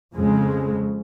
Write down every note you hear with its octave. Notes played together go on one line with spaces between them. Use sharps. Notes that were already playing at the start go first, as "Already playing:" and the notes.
F2 C#3 G#3